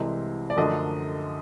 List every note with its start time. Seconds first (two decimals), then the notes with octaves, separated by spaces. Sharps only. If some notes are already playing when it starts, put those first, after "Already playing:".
Already playing: C2 C3 E3 G#3
0.50 D5
0.57 F#2 D3 F3 A3 D4 D#5